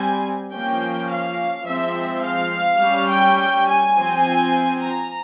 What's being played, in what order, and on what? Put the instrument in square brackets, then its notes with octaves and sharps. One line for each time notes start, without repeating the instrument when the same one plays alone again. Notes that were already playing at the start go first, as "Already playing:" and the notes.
Already playing: [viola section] G3 C4 G#5
F3 A#3 C#4 G5
F5
F3 G#3 C4 E5
F5
G3 C#4
G5
G#5
F3 C4
A#5